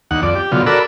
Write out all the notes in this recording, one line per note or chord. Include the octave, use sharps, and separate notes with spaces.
D#2 F#5
F2 D5
G4
B2 D3 F#3 F4
F#4 A4 A#4 D5 B5 E6